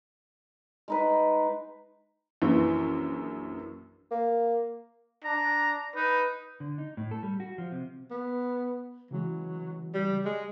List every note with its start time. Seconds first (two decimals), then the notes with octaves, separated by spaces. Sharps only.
0.88 G#3 D#4 B4
2.42 A#1 F#2 E3
4.11 A#3
5.25 D4 A#5
5.96 D#4 B4
6.60 D3
6.78 D#4
6.97 A2
7.11 A4
7.23 G3
7.40 F#4
7.58 F3
7.72 C3
8.11 B3
9.11 C#3 E3 F#3 G#3
9.94 G3
10.25 G#3